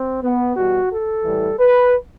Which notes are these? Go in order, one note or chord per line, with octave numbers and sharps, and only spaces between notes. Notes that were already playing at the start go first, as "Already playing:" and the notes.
Already playing: C4
B3
E2 B2 G3 F#4
A4
A2 E3 G3
B4